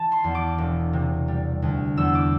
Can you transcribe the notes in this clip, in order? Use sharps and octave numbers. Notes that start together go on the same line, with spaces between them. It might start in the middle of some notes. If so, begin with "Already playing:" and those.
Already playing: E3 A5
C6
E2
D6
E1
C3
G3
D2
E2 E6
D6